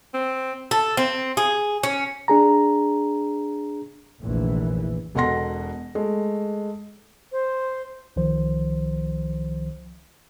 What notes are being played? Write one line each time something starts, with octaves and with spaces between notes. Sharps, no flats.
C4
A4
C4
G#4
C#4
D4 G#4 A#5
F1 A#1 E3
E1 B2 A4 F#5 C6 A#6
G#3 A3
C5
C2 D#3 F3 C5